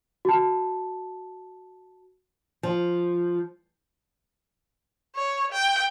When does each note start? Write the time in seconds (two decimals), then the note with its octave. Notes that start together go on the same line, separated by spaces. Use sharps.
0.25 F#4 A5
2.63 F3
5.16 C#5
5.52 G5